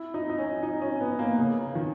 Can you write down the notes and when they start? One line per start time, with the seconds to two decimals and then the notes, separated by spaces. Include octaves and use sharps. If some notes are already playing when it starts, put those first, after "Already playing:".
Already playing: E4
0.14 D#4
0.30 D#4
0.38 C#4
0.63 D#4
0.81 C#4
1.01 B3
1.19 A#3
1.38 C#3
1.75 D#3